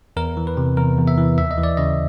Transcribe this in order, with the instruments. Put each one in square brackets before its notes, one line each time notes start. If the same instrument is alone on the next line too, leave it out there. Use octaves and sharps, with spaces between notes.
[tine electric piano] E2 A#4
E3
B4
C3
E2 A#4
E2
E5
E3
D#2 E5
D#5
E3
D5
C#3 D#5